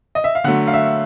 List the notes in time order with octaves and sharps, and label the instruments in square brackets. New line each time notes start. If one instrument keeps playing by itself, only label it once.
[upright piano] D#5
E5
F5
D3 F#3 A3 F#5
F5
E5